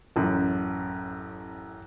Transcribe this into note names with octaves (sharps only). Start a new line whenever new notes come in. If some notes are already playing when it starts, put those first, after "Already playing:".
A1 F#2